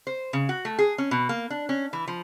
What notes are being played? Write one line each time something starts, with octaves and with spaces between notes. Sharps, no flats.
C5
C#3
F#4
A3
G#4
C#4
B2
A#3
D4
C#4
E3
F3